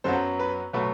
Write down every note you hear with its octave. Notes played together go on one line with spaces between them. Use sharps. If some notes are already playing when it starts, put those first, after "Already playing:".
F#2 F#3 B3 A4 C5
B4
B2 F#3 A3 B4